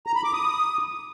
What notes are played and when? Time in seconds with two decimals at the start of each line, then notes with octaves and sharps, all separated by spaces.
0.07 A#5
0.15 B5
0.24 D6
0.33 D#6